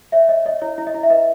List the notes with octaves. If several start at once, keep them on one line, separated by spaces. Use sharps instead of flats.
C#5 E5
C#5 D#5
C#5 D#5
E4 C#5
E4
D#5
E4
E5
B4 D#5